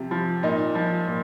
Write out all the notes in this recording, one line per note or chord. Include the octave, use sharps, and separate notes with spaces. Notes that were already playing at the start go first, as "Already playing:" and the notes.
Already playing: C3 F3
F3
A#2 D#4
F3
A#2